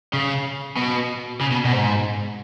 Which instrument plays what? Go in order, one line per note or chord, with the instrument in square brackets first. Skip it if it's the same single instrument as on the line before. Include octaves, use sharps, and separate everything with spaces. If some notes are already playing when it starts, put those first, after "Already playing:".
[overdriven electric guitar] C#3
B2
C#3
B2
B2
G#2